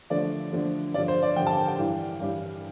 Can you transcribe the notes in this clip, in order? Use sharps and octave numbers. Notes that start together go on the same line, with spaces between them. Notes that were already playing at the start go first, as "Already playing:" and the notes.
D3 F3 A3 D4 D5
D3 F3 A3 D4
G2 D3 F3 D5
C5
D5
G2 D3 F3 G5
A5
G5
G5
G2 E3 G3 D4
G2 E3 G3 D4